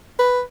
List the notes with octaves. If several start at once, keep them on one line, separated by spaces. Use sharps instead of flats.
B4